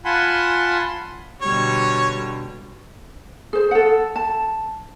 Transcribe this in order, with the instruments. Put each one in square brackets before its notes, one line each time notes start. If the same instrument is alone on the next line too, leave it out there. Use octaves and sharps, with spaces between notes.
[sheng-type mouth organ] F4 F#5 G#5 A5 B5 C6
[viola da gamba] B2 D3 G3 [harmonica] C#5
[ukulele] G#4 C5
A4 F#5
A5